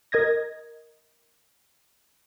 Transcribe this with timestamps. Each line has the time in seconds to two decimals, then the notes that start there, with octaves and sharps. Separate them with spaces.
0.12 A#4 D#5 G#6 A#6